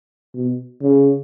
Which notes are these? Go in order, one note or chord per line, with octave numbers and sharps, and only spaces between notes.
B2
C#3